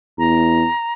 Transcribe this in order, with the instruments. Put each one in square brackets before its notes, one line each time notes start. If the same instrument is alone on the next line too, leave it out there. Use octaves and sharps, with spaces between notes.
[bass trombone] E2 [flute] A#5